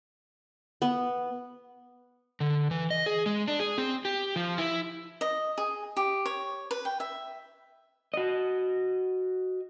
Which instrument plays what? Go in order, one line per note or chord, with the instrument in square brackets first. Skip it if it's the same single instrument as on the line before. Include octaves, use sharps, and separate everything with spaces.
[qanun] B3
[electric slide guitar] D3
E3
D#5
G#4
G#3
D4
G#4
C4
G4
F3
E4
[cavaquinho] D#5
G#4
G4
C#5
B4
G5
E5
[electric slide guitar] F#4 D#5